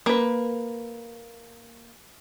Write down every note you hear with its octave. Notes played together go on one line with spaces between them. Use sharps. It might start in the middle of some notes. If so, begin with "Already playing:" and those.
A#3 B4